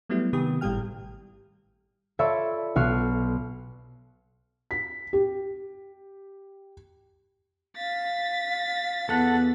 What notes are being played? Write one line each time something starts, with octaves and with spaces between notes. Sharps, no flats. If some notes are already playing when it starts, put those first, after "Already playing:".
F#3 G3 A3 B3 E4
C3 D#3 B3 G4 D#6
G#1 A2 G3 G4 G5 F6
F4 A4 C#5 D5 E5 B5
B1 F#4 F6 C7
B6
G4
F5 A6 B6
E2 A4 F#5 A5